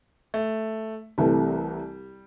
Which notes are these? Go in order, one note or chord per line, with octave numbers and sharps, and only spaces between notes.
A3
C2 C3 E3 G3 A3